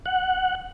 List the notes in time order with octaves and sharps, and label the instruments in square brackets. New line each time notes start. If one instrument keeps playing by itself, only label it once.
[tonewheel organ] F#5